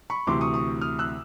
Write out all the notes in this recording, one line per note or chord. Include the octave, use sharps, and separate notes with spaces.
B5 C#6
D2 C3 E3 C6 D6
C#6 D#6
C#6 D#6
D#6 F6
E6 F#6